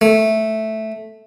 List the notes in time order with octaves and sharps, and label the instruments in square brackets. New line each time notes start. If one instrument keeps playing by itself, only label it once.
[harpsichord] A3